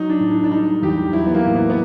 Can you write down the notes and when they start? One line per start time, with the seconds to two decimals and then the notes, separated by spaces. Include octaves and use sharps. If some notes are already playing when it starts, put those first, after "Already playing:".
Already playing: F#3 D#4
0.09 D4
0.19 A2
0.31 D4
0.44 D4
0.51 G3 D#4
0.82 E2 G4
1.13 F#3 E4
1.26 B3
1.34 A#3
1.45 A2
1.55 B3
1.70 B3